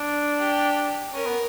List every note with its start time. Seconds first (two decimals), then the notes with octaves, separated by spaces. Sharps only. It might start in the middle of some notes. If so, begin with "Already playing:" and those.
Already playing: D4
0.39 G4
1.13 C#4 A#4
1.25 B3